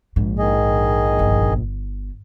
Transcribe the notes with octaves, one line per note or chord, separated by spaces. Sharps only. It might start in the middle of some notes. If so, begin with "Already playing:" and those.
A#1 G#2
D#3 G#4 D#5
G1